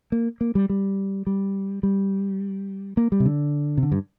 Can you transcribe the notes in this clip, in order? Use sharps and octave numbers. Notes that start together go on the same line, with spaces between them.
A#3
A#3
G3
G3
G3
G3
A#3
G3
C3
D3
C3
D3
G2